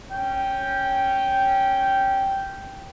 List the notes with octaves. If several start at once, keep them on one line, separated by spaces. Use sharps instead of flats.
C#4 G5